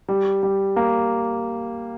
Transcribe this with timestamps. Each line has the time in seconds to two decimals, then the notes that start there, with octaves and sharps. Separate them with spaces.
0.09 G3
0.43 G3
0.76 A#3